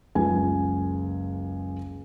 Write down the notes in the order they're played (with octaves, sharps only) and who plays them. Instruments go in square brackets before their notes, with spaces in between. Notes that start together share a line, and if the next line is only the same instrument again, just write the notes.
[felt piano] F#1 C#2 F4 G#5